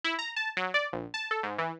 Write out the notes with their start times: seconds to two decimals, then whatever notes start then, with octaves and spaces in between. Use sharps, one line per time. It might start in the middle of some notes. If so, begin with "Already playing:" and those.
0.04 E4
0.19 A#5
0.36 A5
0.57 F#3
0.74 D5
0.93 A#1
1.14 A5
1.31 A4
1.43 G#2
1.58 E3